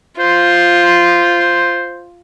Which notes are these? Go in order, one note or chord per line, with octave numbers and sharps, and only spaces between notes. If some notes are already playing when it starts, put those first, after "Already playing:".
F4 C5